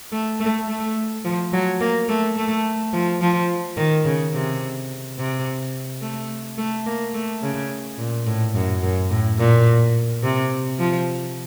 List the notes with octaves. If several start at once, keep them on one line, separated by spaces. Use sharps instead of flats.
A3
A3
A3
F3
F#3
A#3
A3
A3
F3
F3
D#3
C#3
C3
C3
A3
A3
A#3
A3
C#3
A#2
A2
F#2
F#2
A2
A#2
C3
F3